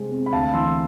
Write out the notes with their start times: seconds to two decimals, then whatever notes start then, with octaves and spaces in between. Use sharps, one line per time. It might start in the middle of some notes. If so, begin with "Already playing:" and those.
Already playing: C3 G#3 C4
0.11 C4
0.26 B5
0.33 D2 F5 A5
0.54 E3 C6 E6